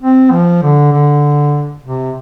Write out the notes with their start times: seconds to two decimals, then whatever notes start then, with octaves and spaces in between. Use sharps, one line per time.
0.02 C4
0.32 F3
0.63 D3
0.93 D3
1.84 C3